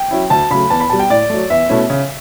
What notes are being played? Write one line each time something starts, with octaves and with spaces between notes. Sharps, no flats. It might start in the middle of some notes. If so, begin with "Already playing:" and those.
Already playing: G5
F#3 C#4 E4
D2 A5
C#3 F#3 A3 B5
E2 A5
B5
B2 G3 A5
G5
A2 D5
F#3 A3
E2 E5
B2 A3 C#4 E4
C#3